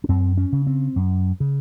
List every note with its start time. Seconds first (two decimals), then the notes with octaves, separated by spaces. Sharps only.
0.04 C#4
0.09 F#2 C4
0.38 C#4
0.52 C#3
0.67 C4
0.96 F#2
1.40 C#3